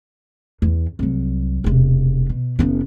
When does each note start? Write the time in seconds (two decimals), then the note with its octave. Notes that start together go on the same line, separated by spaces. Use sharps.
0.62 E2
0.99 C2 F#3
1.64 E1 C3
2.29 B2
2.59 F#1 B3